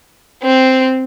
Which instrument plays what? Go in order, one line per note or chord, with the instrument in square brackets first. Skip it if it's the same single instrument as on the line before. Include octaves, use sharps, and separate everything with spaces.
[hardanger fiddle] C4